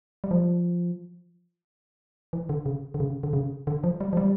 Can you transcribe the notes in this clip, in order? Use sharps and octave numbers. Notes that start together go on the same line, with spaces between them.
G3
F3
E3
D3
C#3
D3
C#3
D3
C#3
D3
F3
G3
F3
G3